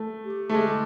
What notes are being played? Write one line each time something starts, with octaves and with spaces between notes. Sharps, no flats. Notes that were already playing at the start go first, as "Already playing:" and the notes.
Already playing: A3
G4
A3
G#3 G4